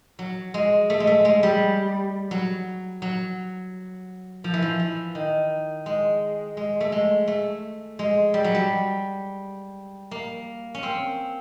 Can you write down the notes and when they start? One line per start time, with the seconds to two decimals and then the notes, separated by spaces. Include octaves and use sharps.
0.19 F#3
0.54 G#3
0.90 A3
1.00 G#3
1.07 A3
1.25 G#3
1.43 G3
2.31 F#3
3.02 F#3
4.44 F3
4.54 E3
4.62 F3
4.80 E3
5.15 D#3
5.86 G#3
6.57 G#3
6.80 A3
6.92 G#3
7.27 A3
7.99 G#3
8.34 G3
8.44 F#3
8.55 G3
10.11 A#3
10.75 C#4
10.83 C4